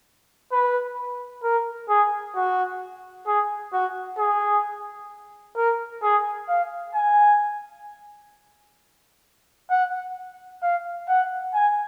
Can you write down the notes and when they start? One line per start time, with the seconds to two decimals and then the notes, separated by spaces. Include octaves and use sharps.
0.52 B4
1.43 A#4
1.89 G#4
2.36 F#4
3.27 G#4
3.73 F#4
4.18 G#4
5.57 A#4
6.03 G#4
6.48 F5
6.95 G#5
9.70 F#5
10.62 F5
11.09 F#5
11.54 G#5